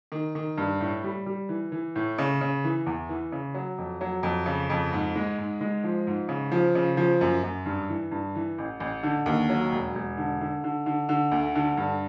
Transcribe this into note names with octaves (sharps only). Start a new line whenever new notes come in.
D#3
D#3
G2
A2
G3
G3
E3
E3
A2
C#3
C#3
E3
E2
E3
C#3
F#3
F2
F#3
F2
C#3
F2
G#2
G#3
G#2
G#3
F3
G#2
C#3
F3
C#3
F3
F#2
F#2
G2
E3
G2
E3
A1
A1
D3
D#2
F#3
E1
E1
D3
D3
D3
D3
D3
D2
D3
G2